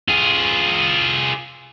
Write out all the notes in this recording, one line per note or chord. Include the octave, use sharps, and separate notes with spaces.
F4 G#4